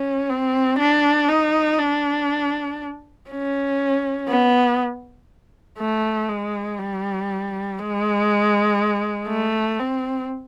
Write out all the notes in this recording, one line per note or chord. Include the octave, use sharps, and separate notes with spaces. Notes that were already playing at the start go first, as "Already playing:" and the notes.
Already playing: C#4
C4
D4
D#4
D4
C#4
B3
A3
G#3
G3
G#3
A3
C4